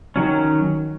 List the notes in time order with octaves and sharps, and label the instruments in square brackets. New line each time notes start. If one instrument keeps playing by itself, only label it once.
[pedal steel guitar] D#3 F#3 C#4